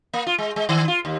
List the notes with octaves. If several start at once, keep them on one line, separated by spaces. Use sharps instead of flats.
A#3
F4
G#3
G#3
D#3
F4
D#2